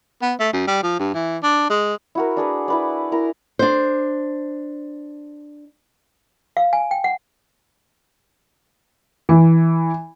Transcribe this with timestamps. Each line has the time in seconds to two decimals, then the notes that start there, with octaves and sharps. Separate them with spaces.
0.22 B3
0.40 A3
0.53 F#2
0.67 G3
0.83 F3
0.99 G2
1.14 E3
1.43 D4
1.70 G#3
2.15 E4 F#4 A#4
2.37 D4 G#4 B4
2.68 E4 B4 D5
3.12 E4 A#4 G#5 A#5
3.59 D4 C5
6.57 F5
6.73 G#5
6.91 G5
7.04 F#5
9.29 E3